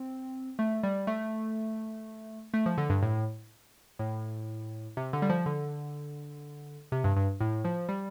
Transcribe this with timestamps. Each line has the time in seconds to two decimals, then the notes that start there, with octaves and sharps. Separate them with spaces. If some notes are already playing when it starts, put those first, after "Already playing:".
Already playing: C4
0.59 A3
0.83 G3
1.07 A3
2.54 A3
2.66 F3
2.78 D3
2.89 G2
3.02 A2
3.99 A2
4.97 C3
5.13 D3
5.22 G3
5.30 F3
5.46 D3
6.92 C3
7.04 G2
7.16 G2
7.40 A2
7.65 F3
7.89 G3